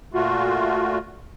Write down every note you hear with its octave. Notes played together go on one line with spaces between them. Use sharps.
A#2 A3 F4 F#4